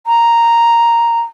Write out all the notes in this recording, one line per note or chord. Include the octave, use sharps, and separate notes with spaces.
A#5